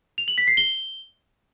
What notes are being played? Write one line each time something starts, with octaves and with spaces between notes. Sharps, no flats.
F7
F#7
B6
C7
G7